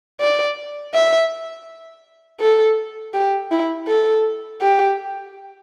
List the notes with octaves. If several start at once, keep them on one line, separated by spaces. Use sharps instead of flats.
D5
E5
A4
G4
E4
A4
G4